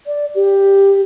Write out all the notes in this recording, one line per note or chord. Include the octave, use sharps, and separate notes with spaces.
D5
G4